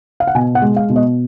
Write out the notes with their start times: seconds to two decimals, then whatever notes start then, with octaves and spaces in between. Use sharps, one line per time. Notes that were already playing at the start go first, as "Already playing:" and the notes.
0.20 F5
0.27 F#5
0.35 B2 G#5
0.55 F#5
0.62 G#3
0.76 F5
0.90 B2
0.96 D#5